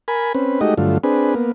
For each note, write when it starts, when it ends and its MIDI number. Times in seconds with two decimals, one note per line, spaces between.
0.08 0.33 70
0.08 0.33 80
0.08 0.33 83
0.34 0.60 60
0.34 0.60 61
0.34 0.60 71
0.61 0.74 56
0.61 0.74 57
0.61 0.74 63
0.61 0.74 66
0.61 0.74 67
0.61 0.74 75
0.78 0.98 43
0.78 0.98 50
0.78 0.98 54
0.78 0.98 57
0.78 0.98 65
1.04 1.34 60
1.04 1.34 62
1.04 1.34 68
1.04 1.34 71
1.34 1.52 58
1.34 1.52 59